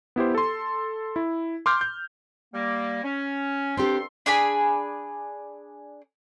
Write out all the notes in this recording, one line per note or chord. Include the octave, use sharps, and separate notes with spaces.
B3 E4 G4 C5
A4 C6
E4
C6 D6 F6 G6
G6
G3 A#3
C#4
G2 C4 D4 G4 A4 C6
D4 G#4 G#5 B5